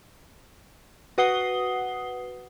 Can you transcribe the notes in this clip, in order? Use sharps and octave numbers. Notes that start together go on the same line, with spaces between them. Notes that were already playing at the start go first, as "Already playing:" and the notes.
F#4 B4 F#5 D#6 C7 G7